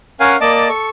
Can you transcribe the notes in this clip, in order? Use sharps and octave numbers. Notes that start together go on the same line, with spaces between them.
C#4 A#4 C#5 F5 F#5 G#5
A#3 D5 D#5 A5 D6
A4 C#6